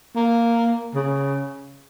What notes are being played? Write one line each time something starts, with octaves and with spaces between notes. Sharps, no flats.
A#3
C#3